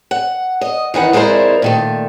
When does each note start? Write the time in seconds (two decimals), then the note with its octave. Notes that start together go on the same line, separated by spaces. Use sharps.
0.11 F#5
0.61 D#5
0.94 D#3 E3 D#4 F#5
1.13 F2 G#3 E4 A#4 C5 D5
1.62 A#2 D#3 A3